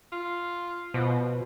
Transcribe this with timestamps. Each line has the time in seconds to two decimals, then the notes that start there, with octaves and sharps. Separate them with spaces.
0.12 F4
0.94 B2 F3